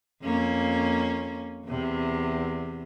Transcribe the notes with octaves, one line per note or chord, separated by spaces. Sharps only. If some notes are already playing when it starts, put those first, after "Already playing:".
F2 A#3 C#4
E2 C3